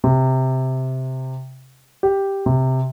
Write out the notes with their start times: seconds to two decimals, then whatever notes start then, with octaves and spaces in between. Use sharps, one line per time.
0.04 C3
2.03 G4
2.46 C3